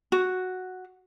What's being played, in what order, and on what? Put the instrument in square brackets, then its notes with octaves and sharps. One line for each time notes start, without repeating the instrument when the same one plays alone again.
[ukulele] F#4